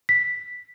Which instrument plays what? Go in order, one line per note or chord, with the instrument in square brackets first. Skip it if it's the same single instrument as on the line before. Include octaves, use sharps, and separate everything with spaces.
[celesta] B6